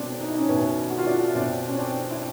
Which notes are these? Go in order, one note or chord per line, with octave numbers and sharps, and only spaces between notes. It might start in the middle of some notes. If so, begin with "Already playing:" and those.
Already playing: B2 C4 D4
D#4
E4
C#4 D#4
B2 B3 C#4
F#4
F4
D4 E4
B2 C4 D4
C#4
C4 D4
E4